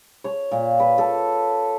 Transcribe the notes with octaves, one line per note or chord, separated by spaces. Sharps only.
C#5
A#2
B4
A4